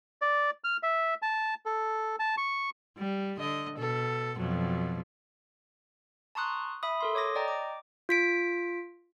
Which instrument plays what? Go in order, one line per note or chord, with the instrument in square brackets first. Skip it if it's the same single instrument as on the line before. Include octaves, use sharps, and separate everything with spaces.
[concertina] D5
F6
E5
A5
A4
A5
C#6
[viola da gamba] G3
D3 D#5
B2 A4
F2 B2 F#3
[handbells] A5 A#5 C6 C#6 D#6 F#6
E5 B5 D#6
A4 A#4 C6
C#5 D6 D#6 A#6
D5 D#5 G5 A#5
D6
F4 B6 D7